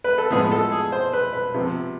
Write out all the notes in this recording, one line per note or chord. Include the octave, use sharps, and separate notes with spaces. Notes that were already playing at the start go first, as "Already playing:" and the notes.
B4
A4
A2 F3 G#3 B3 G#4
A4
G#4
C5
B4
B4
C3 F3 B3